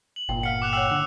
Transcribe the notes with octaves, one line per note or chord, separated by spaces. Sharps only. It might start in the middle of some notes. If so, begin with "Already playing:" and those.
F#7
G1 A#2 G5
F5 F#5 F6 C#7
D6 F#6 F7
C#5 F#5 G5 E6
D3